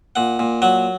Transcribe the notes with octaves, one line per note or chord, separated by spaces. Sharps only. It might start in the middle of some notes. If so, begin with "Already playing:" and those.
A#2 F#5
A#2
F#3 F#5